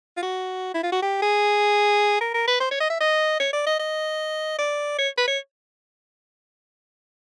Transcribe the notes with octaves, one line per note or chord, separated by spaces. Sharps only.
F4
F#4
E4
F4
F#4
G4
G#4
A#4
A#4
B4
C5
C#5
D#5
E5
D#5
C#5
D5
D#5
D#5
D5
C#5
B4
C#5